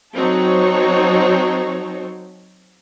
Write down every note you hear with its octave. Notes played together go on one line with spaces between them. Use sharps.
F#3 C4 D#4 F#4 A4 C#5